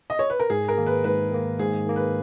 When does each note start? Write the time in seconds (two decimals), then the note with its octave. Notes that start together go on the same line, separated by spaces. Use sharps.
0.10 D#5
0.19 C#5
0.30 B4
0.40 A#4
0.50 G#2 G#4
0.68 A#4
0.78 D#3 A#3
0.86 B4
1.04 G#2 B4
1.32 D#3 A#3
1.59 G#2 G#4
1.87 D#3 A#3
1.96 B4